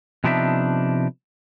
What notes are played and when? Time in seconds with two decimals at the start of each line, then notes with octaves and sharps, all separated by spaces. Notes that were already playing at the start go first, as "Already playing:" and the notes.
0.24 C3 F3 B3 D4 D#4 E5